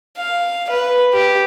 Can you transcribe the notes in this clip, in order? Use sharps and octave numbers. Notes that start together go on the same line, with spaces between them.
F5
B4
G4